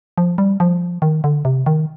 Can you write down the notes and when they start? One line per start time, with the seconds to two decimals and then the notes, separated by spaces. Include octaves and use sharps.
0.18 F3
0.38 G3
0.60 F3
1.02 D#3
1.24 D3
1.45 C3
1.66 D#3